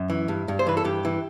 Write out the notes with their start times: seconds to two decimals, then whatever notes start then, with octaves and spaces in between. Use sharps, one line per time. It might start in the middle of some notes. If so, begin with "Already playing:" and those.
Already playing: F#2
0.10 E3
0.28 G2
0.48 G2
0.59 C5
0.67 E3 B4
0.77 A4
0.85 G2 G4
1.05 E3